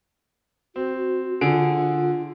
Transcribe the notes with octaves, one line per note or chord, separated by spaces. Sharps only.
C4 F#4
D3 F4 G#4 D7